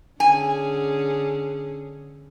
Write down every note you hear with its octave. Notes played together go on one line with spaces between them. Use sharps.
D3 C#4 G#4 G#5